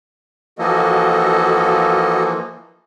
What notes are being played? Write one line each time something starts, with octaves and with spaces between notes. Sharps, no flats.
E3 F3 A#3 F#4 A4 D#5